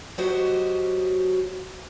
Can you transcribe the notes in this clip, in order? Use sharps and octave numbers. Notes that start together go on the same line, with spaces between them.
F#3 F#4 G4 C5 D#5